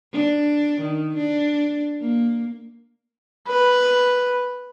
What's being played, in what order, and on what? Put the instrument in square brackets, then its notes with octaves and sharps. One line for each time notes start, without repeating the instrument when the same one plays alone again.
[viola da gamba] D4
D#3
D4
A#3
[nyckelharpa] B4